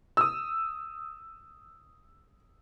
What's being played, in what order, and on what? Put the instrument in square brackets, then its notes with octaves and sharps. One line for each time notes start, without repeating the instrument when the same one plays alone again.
[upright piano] D#6 E6